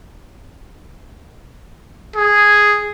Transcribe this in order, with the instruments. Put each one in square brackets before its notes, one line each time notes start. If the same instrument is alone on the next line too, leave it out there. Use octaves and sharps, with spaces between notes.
[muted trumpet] G#4